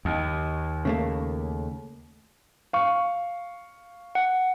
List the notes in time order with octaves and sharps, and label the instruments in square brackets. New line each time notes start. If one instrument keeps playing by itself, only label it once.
[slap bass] D#2
[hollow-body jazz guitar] C#3 A3 A#3
[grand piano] F5 C#6
[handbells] F#5